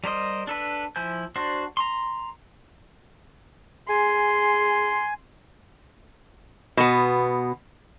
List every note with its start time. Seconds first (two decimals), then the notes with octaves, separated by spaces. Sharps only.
0.04 G3 A#4 C5 D#5
0.47 D4 A4 B4
0.96 F3 E4 C5 G#5 G6
1.36 D4 F#4 C5
1.77 A#5 C6
3.89 G#4 G#5 C6
6.77 B2 B3